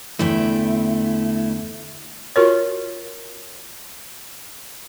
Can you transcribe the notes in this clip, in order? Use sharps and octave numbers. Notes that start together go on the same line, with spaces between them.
E2 D3 A3 E4 G5
F4 F#4 A#4 C#5